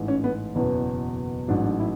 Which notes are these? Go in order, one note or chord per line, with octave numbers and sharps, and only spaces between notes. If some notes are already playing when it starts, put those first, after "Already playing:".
Already playing: A1 G#2 E3
C#4
B3
F#1 E2 B2 B3
A1 G#2 F#3 D4
D4
E4